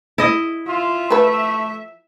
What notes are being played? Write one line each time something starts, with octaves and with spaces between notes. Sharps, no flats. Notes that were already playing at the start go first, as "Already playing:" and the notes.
E4 D#5
F4 E5
F3 A3 A4 B4